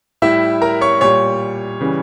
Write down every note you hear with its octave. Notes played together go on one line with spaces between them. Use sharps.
A2 G3 E4 E5
A#4 A#5
C#5 C#6
A#2 G3 C#5 C#6
C#3 E3 G3